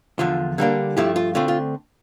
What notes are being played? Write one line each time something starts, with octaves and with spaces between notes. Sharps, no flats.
E2 D3 F3 F4
D3 G3 A#3 D4
G2 F3 A3 E4 G4
F4
D3 A3 C4 F4
F4